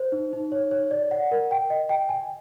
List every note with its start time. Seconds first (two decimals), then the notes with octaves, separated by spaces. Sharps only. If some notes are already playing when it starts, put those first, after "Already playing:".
Already playing: C5
0.12 D#4
0.33 D#4
0.52 C#5
0.71 C#5
0.91 D5
1.11 F#5
1.31 A#4
1.51 G5
1.70 D#5
1.89 G5
2.09 G#5